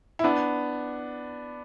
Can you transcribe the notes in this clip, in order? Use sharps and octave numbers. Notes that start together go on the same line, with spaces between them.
E4
B3 D4